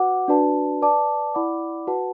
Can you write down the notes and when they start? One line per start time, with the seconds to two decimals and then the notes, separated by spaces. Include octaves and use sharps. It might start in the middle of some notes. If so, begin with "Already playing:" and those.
Already playing: F#4 B4 F#5 D6
0.28 D4 F#4 B4 D5 A5
0.81 B4 D5 A5 D6
1.34 E4 D5 F#5 B5 D6
1.87 F#4 B4 F#5 A5